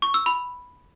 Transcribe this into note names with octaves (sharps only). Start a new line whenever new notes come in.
C#6
E6
B5